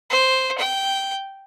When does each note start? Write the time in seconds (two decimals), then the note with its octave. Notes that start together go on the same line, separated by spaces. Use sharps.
0.10 C5
0.58 G5